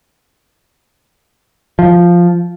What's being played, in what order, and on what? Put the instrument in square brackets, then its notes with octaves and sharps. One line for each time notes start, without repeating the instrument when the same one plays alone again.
[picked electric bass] F3